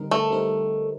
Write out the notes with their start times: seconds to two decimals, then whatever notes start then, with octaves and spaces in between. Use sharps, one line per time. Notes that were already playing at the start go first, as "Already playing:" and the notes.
Already playing: D3 G3 C4 D#4 A#4
0.11 A3
0.30 D3 G3 C4 D#4 A#4